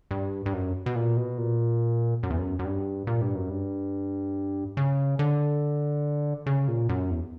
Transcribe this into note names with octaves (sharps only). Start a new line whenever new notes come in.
G2
G2
F#2
B2
A#2
B2
A#2
F#2
E2
F#2
F#2
G2
A#2
G2
F#2
G2
C#3
D3
C#3
A#2
F#2
E2